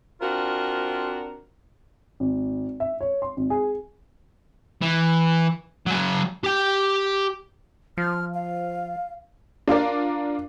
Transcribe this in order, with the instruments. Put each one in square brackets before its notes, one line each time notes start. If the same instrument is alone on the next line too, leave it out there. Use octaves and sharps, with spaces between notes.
[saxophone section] C4 D4 F4 F#4 A#4 C5
[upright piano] G#1
E5
C#5
C6
G#1
G#4
[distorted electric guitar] E3
F#3 G#4
G4 G5
[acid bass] F3 [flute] F6
[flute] F5
[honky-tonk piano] D4 F4 A#4 D5